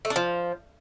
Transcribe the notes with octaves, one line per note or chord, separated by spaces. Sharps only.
A3
D4
F3